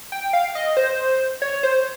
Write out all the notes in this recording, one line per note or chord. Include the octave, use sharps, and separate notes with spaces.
G5
F5
D#5
C5
C#5
C5